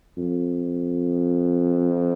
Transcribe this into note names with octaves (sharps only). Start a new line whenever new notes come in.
F2